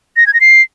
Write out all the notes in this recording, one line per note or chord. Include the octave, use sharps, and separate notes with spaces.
A#6
G#6
A#6
C7